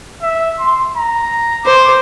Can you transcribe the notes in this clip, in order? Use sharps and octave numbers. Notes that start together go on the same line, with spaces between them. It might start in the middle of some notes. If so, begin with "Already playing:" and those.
E5
C6
A#5
C5 D6